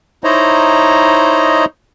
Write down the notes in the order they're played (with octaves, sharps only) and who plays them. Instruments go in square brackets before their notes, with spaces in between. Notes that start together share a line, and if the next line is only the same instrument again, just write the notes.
[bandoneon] D#4 E4 C5 C#5 D#5 A#5